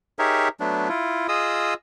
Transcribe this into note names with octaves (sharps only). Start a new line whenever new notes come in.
D#4 G4 G#4 A#4 C#5 E5
F#3 A3 B3 D4
E4 F4
F4 G#4 D#5 D#6 E6